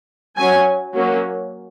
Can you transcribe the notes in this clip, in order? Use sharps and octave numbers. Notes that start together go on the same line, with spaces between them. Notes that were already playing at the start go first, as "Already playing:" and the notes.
F#3 C#4 G#5
F#3 A#3 C#4